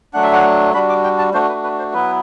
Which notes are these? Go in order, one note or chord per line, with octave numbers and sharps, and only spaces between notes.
F#3 A3 D4 F#5
E5
F#5
G3 D4 F#4 B5
D6
G5
A5
A3 D4 F#4 C5
B4
B4
C5
F#3 B3 E4 B4